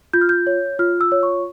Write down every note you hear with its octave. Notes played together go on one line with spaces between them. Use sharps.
F4 G6
F6
G6
C#5
F4 F6
E6
C#5
C#6